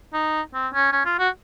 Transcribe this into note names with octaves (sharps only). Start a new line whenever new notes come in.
D#4
C4
C#4
C#4
F4
F#4